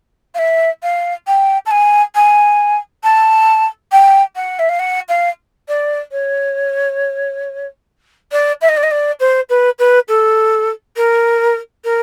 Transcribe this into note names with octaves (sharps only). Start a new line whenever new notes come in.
F5
E5
F5
G5
A5
G#5
G#5
A5
G5
F#5
E5
F5
F#5
F5
D5
C#5
D5
E5
D#5
D5
D#5
D5
C5
B4
B4
A4
A#4
A#4